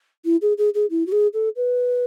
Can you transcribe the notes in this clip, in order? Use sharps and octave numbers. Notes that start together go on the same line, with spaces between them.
E4
G#4
G#4
G#4
E4
F#4
G#4
A4
B4